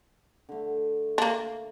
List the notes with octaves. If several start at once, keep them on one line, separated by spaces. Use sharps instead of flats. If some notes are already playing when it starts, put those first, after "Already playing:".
D3 A3
A#3 D4